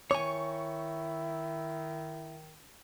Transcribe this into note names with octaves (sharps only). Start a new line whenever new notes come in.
D#3 E4 C#5 G#5 C#6